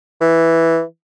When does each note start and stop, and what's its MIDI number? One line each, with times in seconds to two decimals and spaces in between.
0.21 0.82 52